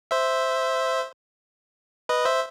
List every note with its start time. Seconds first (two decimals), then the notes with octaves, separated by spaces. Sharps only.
0.11 C5 E5
2.09 B4 D#5
2.25 C5 E5